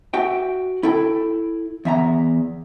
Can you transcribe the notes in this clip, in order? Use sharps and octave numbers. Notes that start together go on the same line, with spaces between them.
F#4 E5 G5
E4 A4 G5
E2 E5 A#5